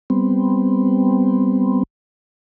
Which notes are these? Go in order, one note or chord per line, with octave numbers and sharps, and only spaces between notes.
G3 B3 C4